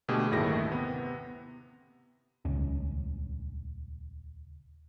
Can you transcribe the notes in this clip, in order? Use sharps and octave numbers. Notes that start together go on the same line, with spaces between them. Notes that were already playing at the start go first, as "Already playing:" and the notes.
B2 D3 A3 G4 G#4
G1 D#2 A2 D#3 E4 A#6
C3 B3
D#1 C#2 C#4